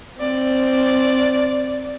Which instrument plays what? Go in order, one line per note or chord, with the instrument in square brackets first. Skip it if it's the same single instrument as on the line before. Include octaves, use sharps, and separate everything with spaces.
[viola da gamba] C4 [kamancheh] D5